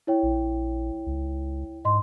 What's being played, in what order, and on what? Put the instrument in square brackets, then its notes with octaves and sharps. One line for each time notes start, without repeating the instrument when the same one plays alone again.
[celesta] E4 C#5 G5
[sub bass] A#1
C#2
[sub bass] G#2 [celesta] D#5 C6